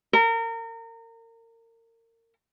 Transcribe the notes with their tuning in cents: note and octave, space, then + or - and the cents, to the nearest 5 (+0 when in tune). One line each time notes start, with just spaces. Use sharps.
A#4 -30